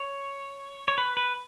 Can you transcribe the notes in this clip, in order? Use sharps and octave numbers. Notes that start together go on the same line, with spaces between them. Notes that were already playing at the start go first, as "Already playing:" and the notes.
Already playing: C#5
C#5
B4
B4